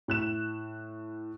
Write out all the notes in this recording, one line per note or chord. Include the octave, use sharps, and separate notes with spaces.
A2 F#6 E7